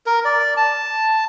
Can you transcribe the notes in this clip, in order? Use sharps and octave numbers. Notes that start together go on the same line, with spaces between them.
A#4
D5
A5